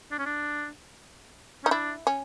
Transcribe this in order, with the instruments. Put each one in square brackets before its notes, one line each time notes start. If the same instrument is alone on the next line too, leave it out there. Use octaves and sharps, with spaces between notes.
[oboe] D4
C#4
D4
[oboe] C#4 [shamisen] D#4
[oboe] D4 [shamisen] E4
[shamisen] C#4